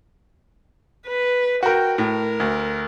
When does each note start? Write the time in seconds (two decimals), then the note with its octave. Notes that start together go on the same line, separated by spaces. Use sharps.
1.07 B4
1.63 F#4 A#4 G5
1.98 A2 A#4
2.40 D2